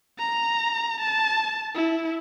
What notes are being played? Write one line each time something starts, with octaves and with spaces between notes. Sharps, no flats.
A#5
A5
E4